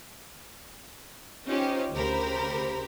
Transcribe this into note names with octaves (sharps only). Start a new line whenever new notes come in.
C#4 D#4 F4 G4 C5
D2 C#3 G4 A#4 C5 B5